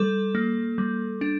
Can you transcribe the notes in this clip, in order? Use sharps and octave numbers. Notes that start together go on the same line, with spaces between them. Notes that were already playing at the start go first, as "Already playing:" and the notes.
Already playing: G3 A4
A#3
G3
D4